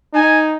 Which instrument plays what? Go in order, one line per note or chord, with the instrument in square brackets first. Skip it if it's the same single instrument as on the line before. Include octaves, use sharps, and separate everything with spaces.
[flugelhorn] D#4 [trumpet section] G#5